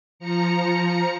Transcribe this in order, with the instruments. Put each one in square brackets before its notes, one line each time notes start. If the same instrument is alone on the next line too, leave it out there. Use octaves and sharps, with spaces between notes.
[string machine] F3 A#5 C#7